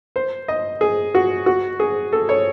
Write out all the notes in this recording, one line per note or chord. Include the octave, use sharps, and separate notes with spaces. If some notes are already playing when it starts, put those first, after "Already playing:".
C5
D#5
G#4
F#4
F#4
G#4
A4
C#5